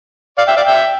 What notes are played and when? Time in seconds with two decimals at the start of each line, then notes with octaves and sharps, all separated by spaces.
0.38 D5 F5
0.48 E5 G5
0.57 D5 F5
0.67 E5 G5